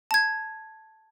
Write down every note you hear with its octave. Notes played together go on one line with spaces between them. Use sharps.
A5 G#6